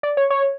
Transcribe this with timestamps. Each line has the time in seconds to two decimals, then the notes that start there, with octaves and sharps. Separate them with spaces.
0.03 D5
0.17 C#5
0.30 C#5